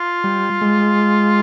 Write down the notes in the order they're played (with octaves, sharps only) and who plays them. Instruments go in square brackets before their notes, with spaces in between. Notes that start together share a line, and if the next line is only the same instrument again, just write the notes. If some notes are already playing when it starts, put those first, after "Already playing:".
Already playing: [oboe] F4
[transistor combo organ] G3
G#3